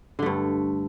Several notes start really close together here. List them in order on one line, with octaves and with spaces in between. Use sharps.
D3 A3 G2